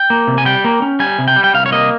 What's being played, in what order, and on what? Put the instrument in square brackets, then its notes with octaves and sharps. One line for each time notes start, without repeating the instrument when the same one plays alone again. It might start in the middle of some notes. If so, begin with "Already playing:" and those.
Already playing: [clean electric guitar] G5
A#3
C3
G#5
G3 G5
A#3
C#4
G3 G#5
C3
G5
G3
G5
C2 F5
C#5
A#3 D#5